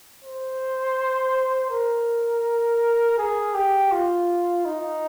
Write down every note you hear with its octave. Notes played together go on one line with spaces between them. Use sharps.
C5
A#4
G#4
G4
F4
D#4